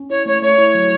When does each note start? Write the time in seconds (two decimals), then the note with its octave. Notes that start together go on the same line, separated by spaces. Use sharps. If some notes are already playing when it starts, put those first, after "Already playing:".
Already playing: C#4
0.09 E4 C#5
0.26 A3 C#5
0.42 A3 C#5
0.58 E4
0.75 F#3